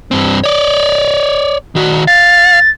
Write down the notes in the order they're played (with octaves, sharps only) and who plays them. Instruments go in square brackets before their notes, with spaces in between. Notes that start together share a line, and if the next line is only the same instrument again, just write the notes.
[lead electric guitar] G2 C4
C#5 D5
D#3 F#4
[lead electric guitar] F5 [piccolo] A6